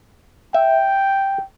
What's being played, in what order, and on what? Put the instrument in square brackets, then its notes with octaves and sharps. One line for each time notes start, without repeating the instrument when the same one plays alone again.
[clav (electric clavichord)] E5 [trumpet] G5